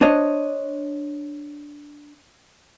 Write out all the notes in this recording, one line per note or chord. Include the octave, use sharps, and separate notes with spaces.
D4 C5 C#5 D#5